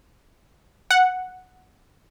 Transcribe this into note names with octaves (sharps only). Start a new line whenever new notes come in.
F#5